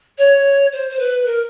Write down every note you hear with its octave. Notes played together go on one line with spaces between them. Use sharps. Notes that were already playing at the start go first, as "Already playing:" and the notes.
C#5
C5
C5
B4
A#4